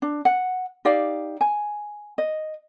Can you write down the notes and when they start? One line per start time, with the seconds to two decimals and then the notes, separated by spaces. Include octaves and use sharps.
0.02 D4
0.25 F#5
0.85 D#4 G4 D5 F5
1.41 G#5
2.18 D#5